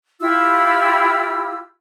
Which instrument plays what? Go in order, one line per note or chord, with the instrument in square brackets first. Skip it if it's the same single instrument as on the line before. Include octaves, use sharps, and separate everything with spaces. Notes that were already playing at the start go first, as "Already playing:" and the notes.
[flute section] E4 F4 G4 E6